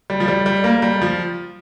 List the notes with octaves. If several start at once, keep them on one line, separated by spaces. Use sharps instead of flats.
G3
F3
G3
G3
A#3
G3
F3